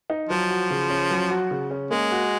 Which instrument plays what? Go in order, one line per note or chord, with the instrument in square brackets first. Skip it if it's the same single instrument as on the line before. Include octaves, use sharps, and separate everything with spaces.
[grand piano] D#4
[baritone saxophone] F3 [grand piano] F#3
[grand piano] F#4
C#3
C#4
F#3
F#4
C#3
C#4
[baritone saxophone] G#3 [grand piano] A#3
[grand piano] F#4